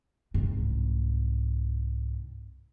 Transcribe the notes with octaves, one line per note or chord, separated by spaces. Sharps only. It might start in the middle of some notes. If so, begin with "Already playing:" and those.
C2 G#2